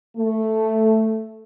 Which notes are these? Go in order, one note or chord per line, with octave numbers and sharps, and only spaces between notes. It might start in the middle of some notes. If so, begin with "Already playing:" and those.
A3